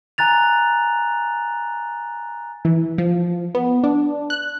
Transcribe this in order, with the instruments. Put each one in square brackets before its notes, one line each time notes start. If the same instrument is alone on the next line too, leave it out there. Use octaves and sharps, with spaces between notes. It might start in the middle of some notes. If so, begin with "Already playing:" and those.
[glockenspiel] G#5 A#5 F#6 A6 F7
[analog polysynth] E3
F3
B3
D4
F#6